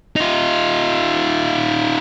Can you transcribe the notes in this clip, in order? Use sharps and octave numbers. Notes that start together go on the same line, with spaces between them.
D#4 F4